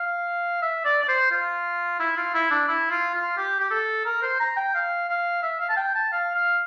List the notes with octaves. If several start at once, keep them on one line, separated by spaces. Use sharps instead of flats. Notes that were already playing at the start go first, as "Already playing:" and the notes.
Already playing: F5
E5
D5
D5
C5
F4
E4
F4
E4
D4
E4
F4
F4
G4
G4
A4
A#4
C5
A#5
G5
F5
F5
E5
F5
A5
G5
A5
F5
F5